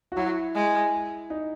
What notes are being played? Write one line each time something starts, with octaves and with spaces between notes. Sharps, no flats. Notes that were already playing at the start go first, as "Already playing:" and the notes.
F#4
F#3 E4
G#3
D#4